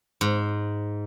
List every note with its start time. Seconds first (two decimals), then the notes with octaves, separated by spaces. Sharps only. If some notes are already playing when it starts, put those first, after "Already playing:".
0.21 G#2